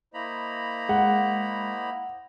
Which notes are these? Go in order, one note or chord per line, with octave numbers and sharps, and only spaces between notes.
A#3 E4 C5 D#5 A#5 B5
G#3 F#5